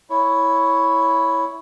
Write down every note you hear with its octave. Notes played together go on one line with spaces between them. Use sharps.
E4 C#5